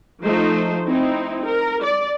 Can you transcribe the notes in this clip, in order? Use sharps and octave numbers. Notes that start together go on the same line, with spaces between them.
F3 A3 D#4 C5
C4 D#4 E4
A#4
D5